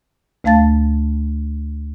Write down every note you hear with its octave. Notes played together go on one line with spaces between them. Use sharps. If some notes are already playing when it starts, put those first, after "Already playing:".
D2 A3 F5 A5 A6